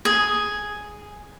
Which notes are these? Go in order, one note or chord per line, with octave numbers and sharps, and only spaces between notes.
G#4